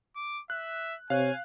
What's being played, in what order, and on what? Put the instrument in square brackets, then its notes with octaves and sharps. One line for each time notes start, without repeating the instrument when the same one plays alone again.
[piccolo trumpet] D6
[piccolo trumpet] E5 [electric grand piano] F#6
[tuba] C3 [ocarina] C#5 [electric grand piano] F5 F#6 [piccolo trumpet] G#5